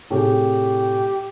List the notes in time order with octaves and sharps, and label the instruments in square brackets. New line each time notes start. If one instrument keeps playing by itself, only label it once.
[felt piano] A2 C3 G#4 [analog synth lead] G4